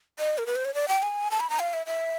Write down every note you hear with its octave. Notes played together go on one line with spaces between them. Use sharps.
D#5
A#4
B4
C5
C#5
D5
G5
G#5
A5
B5
A#5
F5
E5
E5